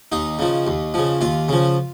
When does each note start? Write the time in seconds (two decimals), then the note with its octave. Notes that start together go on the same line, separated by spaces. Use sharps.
0.12 D#2 D#4
0.39 C#3 F3
0.67 D#2
0.94 C#3 F3
1.21 D#2 F4
1.49 C#3 F3